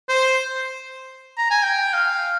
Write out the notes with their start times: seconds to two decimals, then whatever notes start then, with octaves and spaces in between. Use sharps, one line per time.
0.09 C5
1.38 A#5
1.51 G#5
1.63 G5
1.94 F5